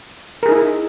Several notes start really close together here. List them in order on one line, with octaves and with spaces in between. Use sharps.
A#4 G#4 D#4 E4